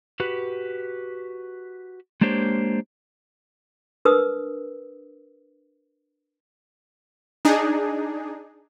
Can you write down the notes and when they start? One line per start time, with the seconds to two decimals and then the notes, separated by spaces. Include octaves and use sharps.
0.20 F#4 G4 B4
2.21 G#3 A#3 D4 G4 C5 C#5
4.05 D4 A#4 B4 D#6 E6
7.45 D4 D#4 G#4